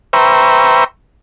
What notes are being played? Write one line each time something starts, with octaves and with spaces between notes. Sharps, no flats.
B4 C5 E5 G5 A#5 C#6